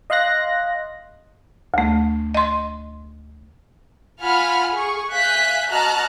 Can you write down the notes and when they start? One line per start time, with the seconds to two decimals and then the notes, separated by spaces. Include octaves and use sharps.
0.10 D#5 F5 C6 F#6 A#6
1.74 D2 A3
2.35 D#5 C6
4.22 F4 F#5 G#5 B5 F6
4.75 G#4 C#6
5.11 E5 F5 G#5 F#6 G6 B6
5.70 F#4 D#5 A5 A#5 F6 F#6